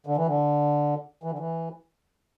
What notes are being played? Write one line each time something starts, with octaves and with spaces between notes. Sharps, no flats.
D3
E3
D3
E3
D3
E3